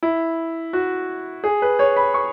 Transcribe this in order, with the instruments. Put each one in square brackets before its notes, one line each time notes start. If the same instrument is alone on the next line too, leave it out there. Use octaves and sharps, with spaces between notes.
[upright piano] E4
F#4
G#4
B4
C#5
B5
C#6